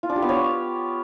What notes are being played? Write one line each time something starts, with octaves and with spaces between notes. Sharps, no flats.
F4
D4
G4
B3
C#5